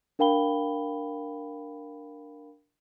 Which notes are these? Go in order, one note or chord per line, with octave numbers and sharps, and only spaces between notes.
D4 A#4 F5 G5 B5 G7